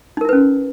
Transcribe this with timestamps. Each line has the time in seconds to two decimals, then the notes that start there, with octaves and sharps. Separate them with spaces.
0.17 D#4
0.21 A#4
0.25 E4
0.29 B4
0.33 C#4